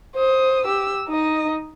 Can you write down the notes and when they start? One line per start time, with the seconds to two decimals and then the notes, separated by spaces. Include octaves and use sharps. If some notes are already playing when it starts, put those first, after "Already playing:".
0.16 C5 D#6
0.65 G4 E6
1.09 D#4 D#5